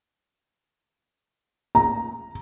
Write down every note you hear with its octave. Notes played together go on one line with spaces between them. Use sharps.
A#5